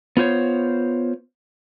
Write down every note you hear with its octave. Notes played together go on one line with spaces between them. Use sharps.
B3 F4 C5 C#5